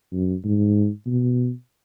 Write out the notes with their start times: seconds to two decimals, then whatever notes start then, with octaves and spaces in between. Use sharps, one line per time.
0.13 F#2
0.44 G#2
1.07 B2